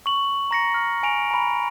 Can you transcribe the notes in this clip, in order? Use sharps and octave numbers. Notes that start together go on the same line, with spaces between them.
C#6 F#7
A#5 A#6 C#7
F6
G#5 D7 F7
A#5 B5